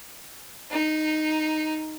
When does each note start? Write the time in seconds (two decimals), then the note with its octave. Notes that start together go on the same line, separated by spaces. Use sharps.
0.71 D#4